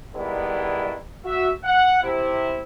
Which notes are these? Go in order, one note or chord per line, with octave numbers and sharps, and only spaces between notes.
D#3 G3 G#3 B3 D4 E4
F#4 E5
F#5
C3 E4